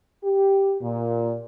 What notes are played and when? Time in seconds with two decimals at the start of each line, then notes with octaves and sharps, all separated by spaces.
0.24 G4
0.81 A#2